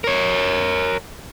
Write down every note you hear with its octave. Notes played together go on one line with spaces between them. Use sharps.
A#4 C#5